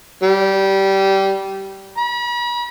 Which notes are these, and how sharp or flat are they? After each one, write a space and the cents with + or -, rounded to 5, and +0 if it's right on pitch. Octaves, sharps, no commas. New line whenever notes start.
G3 -15
B5 -45